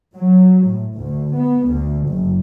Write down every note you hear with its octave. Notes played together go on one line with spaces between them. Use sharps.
F#3
A2
D2
B3
D2
F#1